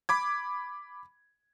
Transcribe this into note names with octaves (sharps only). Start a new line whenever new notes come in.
B5 D6 G#6